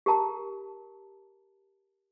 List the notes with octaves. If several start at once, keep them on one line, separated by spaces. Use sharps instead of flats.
G4 A#4 A5 A#5